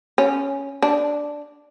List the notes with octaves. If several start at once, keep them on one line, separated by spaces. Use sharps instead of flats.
C#4
D4